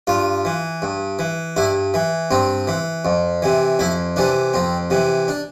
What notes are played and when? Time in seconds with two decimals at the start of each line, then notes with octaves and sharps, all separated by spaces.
0.07 G2 F4
0.45 E3
0.82 G2
1.19 E3
1.56 G2 E4
1.94 E3
2.31 G2 C4
2.68 E3
3.05 F2
3.42 C3 E3
3.79 F2 E4
4.16 C3 E3 D4
4.54 F2 C4
4.90 C3 E3
5.28 D4